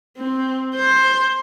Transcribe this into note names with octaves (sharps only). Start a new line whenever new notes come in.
C4
C5